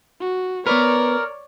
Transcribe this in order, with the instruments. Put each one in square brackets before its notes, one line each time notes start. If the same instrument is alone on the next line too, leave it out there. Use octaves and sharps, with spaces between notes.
[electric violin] F#4
[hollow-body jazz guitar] B3 B4 [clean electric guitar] A#4 [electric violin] C#5 D5